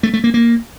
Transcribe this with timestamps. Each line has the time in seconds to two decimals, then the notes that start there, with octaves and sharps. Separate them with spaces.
0.03 A3
0.13 A3
0.24 A#3
0.34 A#3